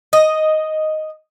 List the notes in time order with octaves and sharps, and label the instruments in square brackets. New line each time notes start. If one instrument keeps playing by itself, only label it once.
[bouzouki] D#5